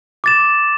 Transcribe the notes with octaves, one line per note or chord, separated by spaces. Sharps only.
D6 A6 E7